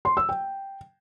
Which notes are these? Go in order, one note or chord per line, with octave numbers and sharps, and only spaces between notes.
C6
E6
G5